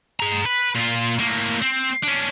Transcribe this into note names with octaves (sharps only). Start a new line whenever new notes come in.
G#4 A#5
B4
A#2 F4
A2 A#3
C4
C#4 D4